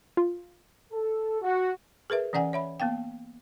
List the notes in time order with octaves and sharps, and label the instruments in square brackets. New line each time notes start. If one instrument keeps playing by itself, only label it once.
[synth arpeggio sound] F4
[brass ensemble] A4
F#4
[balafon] G#4 A#4 B4 E5
E3 C#4 D5 F#5 G#5
C#5 E5 B5
A#3 B3 F5 G5